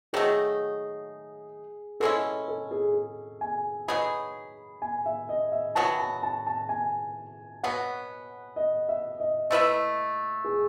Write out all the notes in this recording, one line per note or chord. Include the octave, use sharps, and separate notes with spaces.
D#3 F#3 A3 D#4 G#4
B2 G#3 C#4 E4 A4
A4
G#4
G#4
G#5
F#3 B3 D#4 G#4 B5
G#5
E5
D#5
E5
D#3 F#3 B3 F#4 A5
A5
A5
A5
G#5
B2 F#3 B3 F#5
D#5
E5
D#5
A3 E4 B4 D#5 E5
G#4